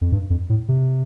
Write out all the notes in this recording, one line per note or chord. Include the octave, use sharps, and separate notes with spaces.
F2
G2
F2
A2
C3